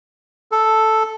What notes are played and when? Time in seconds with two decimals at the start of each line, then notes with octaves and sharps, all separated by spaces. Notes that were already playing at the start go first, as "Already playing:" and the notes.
0.52 A4